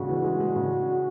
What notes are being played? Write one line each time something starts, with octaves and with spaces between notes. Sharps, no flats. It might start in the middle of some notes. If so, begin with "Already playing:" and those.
Already playing: D#2 C#3 G#3 F#4
E3
G#3
G#3
C#3